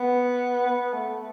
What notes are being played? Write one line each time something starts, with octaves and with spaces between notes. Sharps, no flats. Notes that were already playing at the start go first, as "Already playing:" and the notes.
Already playing: B3
B3
A3